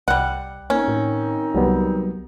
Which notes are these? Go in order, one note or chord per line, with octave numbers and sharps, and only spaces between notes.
C2 G3 F#5
D#3 A#3 C4 C#4 D#4
A2
C2 F#3 G3 B3